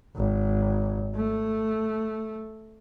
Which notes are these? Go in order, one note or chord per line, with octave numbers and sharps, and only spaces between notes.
G#1
A3